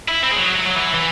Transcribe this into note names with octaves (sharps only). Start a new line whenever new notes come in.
E4
C4
G#3
F#3
F#3
F#3
E3
E3